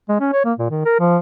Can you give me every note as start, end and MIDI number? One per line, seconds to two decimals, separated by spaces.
0.09 0.16 56
0.20 0.30 61
0.33 0.44 73
0.45 0.53 58
0.59 0.69 46
0.70 0.81 51
0.85 0.95 70
0.99 1.18 53